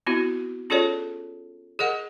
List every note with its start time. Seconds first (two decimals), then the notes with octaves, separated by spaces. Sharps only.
0.06 B3 C4 E4 F#4
0.70 C#4 F4 G#4 A4 C#5 D5
1.79 G#4 A#4 D#5 F#5